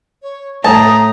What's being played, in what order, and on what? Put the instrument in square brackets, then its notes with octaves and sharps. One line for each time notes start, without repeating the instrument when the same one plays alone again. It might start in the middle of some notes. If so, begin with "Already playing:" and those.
[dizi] C#5
[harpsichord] A2 [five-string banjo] A5 [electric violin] A#5 [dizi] D#6